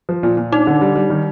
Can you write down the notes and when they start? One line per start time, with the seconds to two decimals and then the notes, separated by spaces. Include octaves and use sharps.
0.09 F3
0.23 A#2
0.37 A#2
0.52 D4 D#4
0.67 D3
0.81 G3
0.95 G3
1.10 D#3